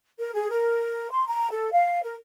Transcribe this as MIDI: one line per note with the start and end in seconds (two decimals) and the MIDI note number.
0.19 0.31 70
0.34 0.50 68
0.50 1.10 70
1.11 1.25 84
1.27 1.48 82
1.51 1.71 69
1.72 2.00 77
2.02 2.14 70